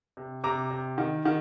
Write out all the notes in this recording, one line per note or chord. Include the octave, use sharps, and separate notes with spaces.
C3
C3 A#5 D6
C3
D#3
D#3